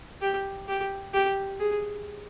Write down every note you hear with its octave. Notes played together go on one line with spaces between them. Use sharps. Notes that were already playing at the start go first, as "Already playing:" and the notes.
G4
G4
G4
G#4